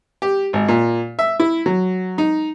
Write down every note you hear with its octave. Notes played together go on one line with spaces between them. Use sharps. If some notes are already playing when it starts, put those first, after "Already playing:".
G4
G#1
A#2
E5
E4
F#3
D#4